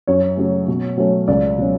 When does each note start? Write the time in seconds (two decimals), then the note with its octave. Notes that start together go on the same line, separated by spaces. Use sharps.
0.07 F#2 C#5
0.37 C#3 F#3 A3
0.68 B2
0.97 F#3 A3 C#4
1.28 C#2 D5
1.58 B2 F#3 C#4